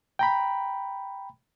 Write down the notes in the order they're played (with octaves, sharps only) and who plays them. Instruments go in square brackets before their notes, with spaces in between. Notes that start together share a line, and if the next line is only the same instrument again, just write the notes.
[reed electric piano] G5 A#5 B5